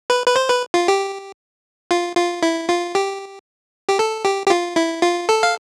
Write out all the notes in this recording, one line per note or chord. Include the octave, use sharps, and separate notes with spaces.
B4
B4
C5
B4
F4
G4
F4
F4
E4
F4
G4
G4
A4
G4
G4
F4
E4
F4
A4
F5